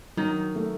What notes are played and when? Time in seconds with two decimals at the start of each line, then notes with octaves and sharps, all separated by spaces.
0.17 D#3 F#3 D#4
0.56 A3